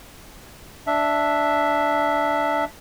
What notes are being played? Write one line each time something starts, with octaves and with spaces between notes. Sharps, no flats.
D4 E5